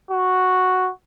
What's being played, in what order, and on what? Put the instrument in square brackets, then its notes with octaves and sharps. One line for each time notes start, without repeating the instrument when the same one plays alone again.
[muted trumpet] F#4